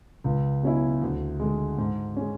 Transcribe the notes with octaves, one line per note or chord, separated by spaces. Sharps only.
C#2
B2 F#3 C#4 E4
D2
D3 G#3
G#2
G#3 C#4